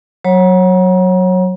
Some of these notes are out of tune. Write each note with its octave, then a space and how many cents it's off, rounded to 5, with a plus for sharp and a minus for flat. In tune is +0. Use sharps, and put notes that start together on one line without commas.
F#3 +0 C#5 -25 A#5 +35